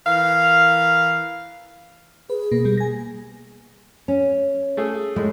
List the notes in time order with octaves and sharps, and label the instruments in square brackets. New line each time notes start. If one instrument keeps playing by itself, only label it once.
[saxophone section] E3 A#4 F5
[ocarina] G#4 [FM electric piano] B4
[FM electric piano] B2 A#3
B2 G3
G#5 A#6
[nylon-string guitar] C#4
[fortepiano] A3 G#4
[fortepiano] A2 [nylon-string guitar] G#3